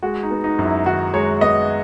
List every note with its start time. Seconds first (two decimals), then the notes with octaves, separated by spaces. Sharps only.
0.03 G#3 F#4
0.23 D#4
0.31 B3
0.44 D#4
0.59 F#2
0.65 E4
0.86 D#3 F#4
1.14 G#3 C#5
1.41 B3 D#5